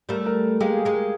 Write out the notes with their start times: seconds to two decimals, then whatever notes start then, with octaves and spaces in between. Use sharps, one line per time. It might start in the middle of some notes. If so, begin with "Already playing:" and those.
0.09 G3 A3 A#4
0.26 A#4
0.61 G#3 A#3 G4
0.77 G#4
0.85 G#3 A#3
0.94 A#4